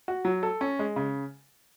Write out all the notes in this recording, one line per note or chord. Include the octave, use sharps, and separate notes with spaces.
F#4
F#3
A4
C#4
G#3
C#3